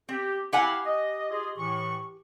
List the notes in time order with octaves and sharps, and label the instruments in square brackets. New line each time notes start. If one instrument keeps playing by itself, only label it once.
[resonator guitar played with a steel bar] C4 [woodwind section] G4
[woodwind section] C4 E4 F5 [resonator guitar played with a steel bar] G4 F#5 G#5
[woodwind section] D#5
F4 G#4 D#5
A2 E3 C#6